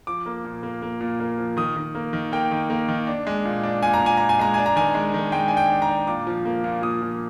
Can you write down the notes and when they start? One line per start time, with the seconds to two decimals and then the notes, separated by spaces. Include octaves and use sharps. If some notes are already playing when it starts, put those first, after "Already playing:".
0.07 F3 D6
0.26 A#3
0.45 A#2
0.63 A#3
0.82 A#3
1.01 A#2
1.20 A#3
1.38 F3
1.57 D#3 D#6
1.77 D#3
1.95 A#3
2.13 D#3
2.32 A#3 G5
2.51 D#3
2.70 A#3
2.88 D#3
3.07 D4
3.27 G#3
3.45 A#2
3.63 D4
3.83 A#2 G#5
3.94 A#5
4.02 A#2 G#5
4.17 A#2 A#5
4.29 G#5
4.39 G#3 A#5
4.54 D4 G#5
4.66 A#5
4.76 D#3 G#5
4.94 G#3
5.14 D#3
5.32 G#3 G5
5.48 D4 G#5
5.57 G5
5.70 D4
5.82 A#5
5.89 D4
6.07 A#2 D6
6.27 F3
6.45 A#3
6.64 A#2
6.82 A#2 D#6
7.02 F3